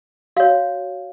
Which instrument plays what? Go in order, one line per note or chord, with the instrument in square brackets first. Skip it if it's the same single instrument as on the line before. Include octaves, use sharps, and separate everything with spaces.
[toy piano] F#4 C#5 F5